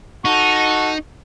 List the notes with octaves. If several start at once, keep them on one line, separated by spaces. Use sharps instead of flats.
D#4 F#4 A4 C#6